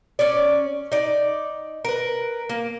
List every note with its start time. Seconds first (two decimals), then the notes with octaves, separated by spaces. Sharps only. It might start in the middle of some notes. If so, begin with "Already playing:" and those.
0.19 C#4 C#5 D5
0.92 D#4 D5
1.85 A#4 B4
2.49 A#3